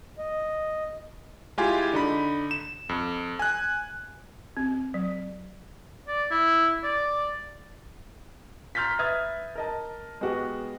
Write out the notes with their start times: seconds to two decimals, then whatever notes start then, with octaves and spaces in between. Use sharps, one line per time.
0.18 D#5
1.58 G#3 E4 F4 G4 G#5
1.93 D3 D#4 B5
2.51 E7
2.89 F2
3.39 G#5 F#6
4.57 C4
4.94 F#3
6.08 D5
6.31 E4
6.84 D5
8.75 A#5 C6 F6 G6 A6 B6
8.99 B4 E5 D#6 F6 G#6 A6
9.55 A#4 D#5 A5
10.21 G#3 B3 F#4 G4